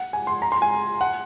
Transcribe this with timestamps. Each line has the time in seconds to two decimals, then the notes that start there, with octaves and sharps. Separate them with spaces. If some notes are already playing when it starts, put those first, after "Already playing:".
Already playing: F#5
0.13 G#5
0.27 C6
0.42 A#5
0.52 C6
0.62 G#5
1.01 F#5